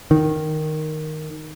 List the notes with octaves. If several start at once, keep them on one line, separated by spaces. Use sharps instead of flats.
D#3